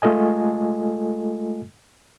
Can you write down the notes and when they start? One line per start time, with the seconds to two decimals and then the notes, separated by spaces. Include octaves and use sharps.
0.02 G#3 A3 F4 A4 D#5 G#5